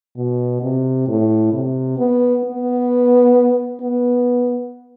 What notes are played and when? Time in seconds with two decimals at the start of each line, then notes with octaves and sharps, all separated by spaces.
0.17 B2
0.62 C3
1.08 A2
1.53 C3
1.98 B3
2.44 B3
3.81 B3